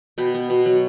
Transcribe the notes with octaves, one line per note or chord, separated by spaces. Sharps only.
B2 G5 B5
B3
B2
F#3